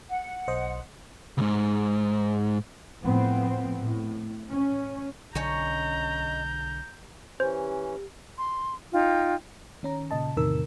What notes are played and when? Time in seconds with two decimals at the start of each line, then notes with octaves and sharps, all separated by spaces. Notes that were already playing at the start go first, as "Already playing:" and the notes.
0.09 F#5
0.48 B1 C5 D#5
1.38 C#2 G#2
3.02 A2 F3 B3 C4
3.78 A2
4.51 C#4
5.35 B1 D3 C#4 D#4 C#5 A#5 G6
7.40 E3 C#4 G4 C5
8.38 C6
8.93 D#4 F4 G5
9.83 D#3 C#4 A#5
10.11 A#2 C#3 D#5 A5
10.37 E2 A2 C3 D#3 A#4 E6